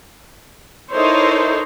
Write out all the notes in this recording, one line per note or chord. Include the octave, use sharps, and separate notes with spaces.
D#4 E4 A4 A#4 C5 C#5